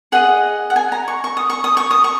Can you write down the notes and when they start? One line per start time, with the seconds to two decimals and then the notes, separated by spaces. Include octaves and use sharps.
0.12 G#4 D#5 F#5
0.70 F#5
0.76 G#5
0.92 A#5
1.08 C#6
1.24 C#6
1.37 D#6
1.50 C#6
1.64 D#6
1.77 C#6
1.91 D#6
2.04 C#6